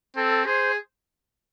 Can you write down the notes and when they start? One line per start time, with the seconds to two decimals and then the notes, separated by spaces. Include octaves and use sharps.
0.16 C4 A4
0.46 G#4 C5